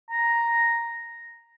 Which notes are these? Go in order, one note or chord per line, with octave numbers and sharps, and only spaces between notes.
A#5